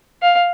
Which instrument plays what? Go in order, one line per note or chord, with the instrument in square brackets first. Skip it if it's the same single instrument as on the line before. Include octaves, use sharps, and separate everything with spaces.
[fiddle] F5